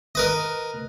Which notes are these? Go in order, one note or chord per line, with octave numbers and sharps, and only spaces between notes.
A#4 B4 D#5